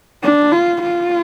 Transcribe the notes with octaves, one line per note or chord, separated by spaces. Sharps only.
D4
F4
F4